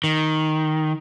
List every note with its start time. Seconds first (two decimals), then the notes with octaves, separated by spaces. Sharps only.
0.04 D#3